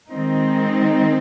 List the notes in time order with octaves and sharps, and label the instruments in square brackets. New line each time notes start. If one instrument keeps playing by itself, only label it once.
[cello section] D#3 G#3 C4 D#4